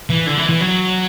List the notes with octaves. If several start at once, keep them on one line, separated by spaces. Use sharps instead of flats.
E3
D3
E3
E3
F#3